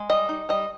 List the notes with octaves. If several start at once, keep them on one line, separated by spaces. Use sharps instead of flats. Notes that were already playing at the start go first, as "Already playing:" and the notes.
Already playing: G#3
G3 D#5
D#4
G3 D#5